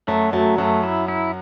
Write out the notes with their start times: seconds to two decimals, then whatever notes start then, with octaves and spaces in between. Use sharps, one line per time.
0.07 F#2 F#3 A3
0.33 F#2 F#3 A3
0.58 F#2 F#3 A3
0.83 E4
1.08 E4